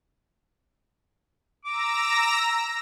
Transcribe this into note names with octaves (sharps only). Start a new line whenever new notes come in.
A#5 D6 E6 A#6